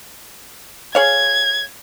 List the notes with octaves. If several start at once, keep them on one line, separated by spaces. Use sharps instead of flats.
G#4 C#5 F5 G#6